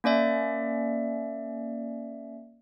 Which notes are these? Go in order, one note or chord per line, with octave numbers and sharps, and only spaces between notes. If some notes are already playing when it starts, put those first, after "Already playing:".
A#3 C#4 D5 E5